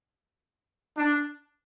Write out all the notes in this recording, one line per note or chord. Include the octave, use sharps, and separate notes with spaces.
D4